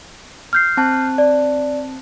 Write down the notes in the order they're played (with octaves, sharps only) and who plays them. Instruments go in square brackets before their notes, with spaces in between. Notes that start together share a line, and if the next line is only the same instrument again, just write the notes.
[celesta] F6 G6 C7
[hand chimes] C4 A5 F#6
[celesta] D5